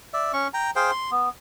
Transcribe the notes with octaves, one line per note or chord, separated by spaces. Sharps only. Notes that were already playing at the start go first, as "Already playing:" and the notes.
D5 E5
C#4 C#6
G5 A#5
G#4 C5 F5 G5
C6
B3